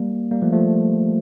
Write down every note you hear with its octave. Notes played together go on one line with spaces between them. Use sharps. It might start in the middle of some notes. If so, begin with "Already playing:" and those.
Already playing: G3 A#3
G3 A#3
F3 A3
F3 A3